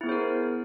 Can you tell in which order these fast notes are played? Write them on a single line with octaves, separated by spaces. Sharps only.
E4 B3 G#4 C5 A#4